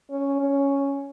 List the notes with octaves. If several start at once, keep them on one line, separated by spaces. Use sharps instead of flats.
C#4
C#4